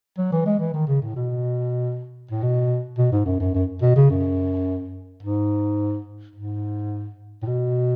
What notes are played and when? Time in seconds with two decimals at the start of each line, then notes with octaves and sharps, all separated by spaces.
0.18 F#3
0.32 E3
0.46 G#3
0.60 E3
0.74 D#3
0.87 C#3
1.02 A2
1.16 B2
2.31 A2
2.43 B2
2.98 B2
3.12 G#2
3.26 F#2
3.40 F#2
3.54 F#2
3.82 B2
3.96 C#3
4.11 F#2
5.23 G#2
6.36 G#2
7.42 A2
7.47 B2